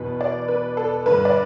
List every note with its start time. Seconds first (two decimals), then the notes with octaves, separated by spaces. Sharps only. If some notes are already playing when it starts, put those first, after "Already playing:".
Already playing: E2 B2 B4
0.21 D5
0.48 B4
0.77 A4
1.06 G2 D3 B4
1.25 D5